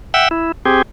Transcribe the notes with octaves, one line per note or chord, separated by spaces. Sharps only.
E5 F#5 G5 E6
E4
C4 G4 G#4